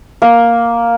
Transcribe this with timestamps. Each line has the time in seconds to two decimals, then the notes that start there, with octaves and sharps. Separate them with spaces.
0.22 A#3